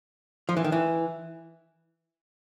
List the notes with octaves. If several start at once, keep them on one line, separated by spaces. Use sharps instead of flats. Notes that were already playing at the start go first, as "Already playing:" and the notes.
F3
E3
D#3
E3